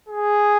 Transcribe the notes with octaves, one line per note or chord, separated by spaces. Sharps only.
G#4